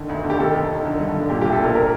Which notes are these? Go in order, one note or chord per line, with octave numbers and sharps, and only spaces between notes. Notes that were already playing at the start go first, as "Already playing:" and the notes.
Already playing: D3 D#3
D2
D3
G4
D#3 A4
D#2
D#3
D3
G2
D3
A#2 G4
G4
C2
A4
A#2 A#4
A#4